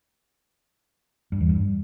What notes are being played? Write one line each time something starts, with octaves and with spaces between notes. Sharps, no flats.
G2
E2
G2